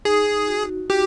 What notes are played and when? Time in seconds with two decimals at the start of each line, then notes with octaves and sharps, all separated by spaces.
0.05 D#4 G#4
0.47 F#4
0.90 F#4 G4